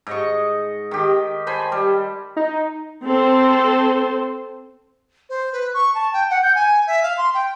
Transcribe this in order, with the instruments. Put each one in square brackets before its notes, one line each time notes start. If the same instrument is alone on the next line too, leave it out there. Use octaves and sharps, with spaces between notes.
[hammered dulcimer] G#2 D#5 C#6
D#3 G4
C5 G#5 A5 B5
G3
[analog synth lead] D#4
[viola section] C4 A4 C5
[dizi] C5
B4
C#6
A5
G5
F#5
G6
G#5
E5
F5
C6
G5